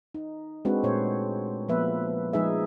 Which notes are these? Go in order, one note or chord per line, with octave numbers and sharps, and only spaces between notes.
D#4
G#3 C4 D4 F#4 B4
A#2 A3 C5 C#5
F3 A#3 B3 B4 E5
F3 G#3 D#4 G#4 B4 E5